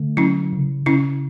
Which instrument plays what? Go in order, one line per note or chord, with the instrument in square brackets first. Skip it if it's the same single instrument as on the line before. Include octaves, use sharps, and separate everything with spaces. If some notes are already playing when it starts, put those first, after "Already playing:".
Already playing: [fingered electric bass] D3 A3
[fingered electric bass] F#3 [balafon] C#4 E4
[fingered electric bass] C#3
[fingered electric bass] C#3 [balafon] C#4 E4